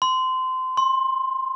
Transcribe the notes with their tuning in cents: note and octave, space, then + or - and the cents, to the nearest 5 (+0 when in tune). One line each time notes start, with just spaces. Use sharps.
C6 -20
C6 +20